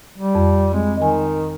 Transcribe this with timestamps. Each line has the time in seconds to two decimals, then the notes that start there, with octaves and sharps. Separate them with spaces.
0.18 G3
0.35 F2
0.73 G#3 C4
0.97 D#3 D#5 G#5